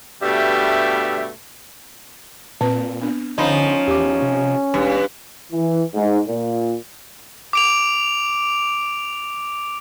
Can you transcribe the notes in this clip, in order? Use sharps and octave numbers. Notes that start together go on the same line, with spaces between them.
G2 B2 G3 A3 G4 E5
A#2 C4 B4 A5
B3 D4
D3 F3 C#4 D#4 C5 B5
E2 G4 D6
C3
E1 G2
E3
G#2
A#2
D6 D7 F7